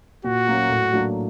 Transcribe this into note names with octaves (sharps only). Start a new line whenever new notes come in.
A#2 F#4
F#3 A#3 C#4
A2
F#3 A#3 D4